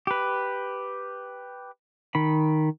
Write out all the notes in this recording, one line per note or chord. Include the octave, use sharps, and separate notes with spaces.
G4 B4
D#3 B5